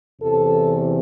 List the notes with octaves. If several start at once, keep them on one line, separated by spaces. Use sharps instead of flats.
E2 C3 E3 A4